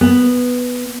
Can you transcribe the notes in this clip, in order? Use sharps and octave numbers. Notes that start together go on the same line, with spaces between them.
B3